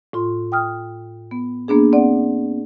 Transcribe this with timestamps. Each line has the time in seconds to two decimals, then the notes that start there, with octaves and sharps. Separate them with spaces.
0.13 A2 F4 C6
0.52 G5 D#6 F6
1.31 B3
1.68 A#3 B3 D4 G#4
1.93 B3 C4 D5 F#5